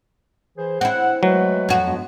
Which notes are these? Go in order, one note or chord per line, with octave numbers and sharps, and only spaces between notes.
E3 G#4 C5
C4 E4 F#5
F#3 G#3 A3 B4
F2 F#4
G2 G#3 B3